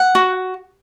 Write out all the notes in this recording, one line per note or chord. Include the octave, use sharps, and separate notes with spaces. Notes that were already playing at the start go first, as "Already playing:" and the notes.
Already playing: F#5
F#4